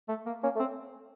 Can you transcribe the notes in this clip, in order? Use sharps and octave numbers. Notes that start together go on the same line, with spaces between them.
A3
A#3
A#3 C#4
A3
C4